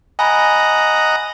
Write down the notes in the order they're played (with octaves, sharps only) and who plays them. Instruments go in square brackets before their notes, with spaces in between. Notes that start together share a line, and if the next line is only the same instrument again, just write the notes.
[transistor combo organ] D#5 F#5 A#5 [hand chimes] G#5 B5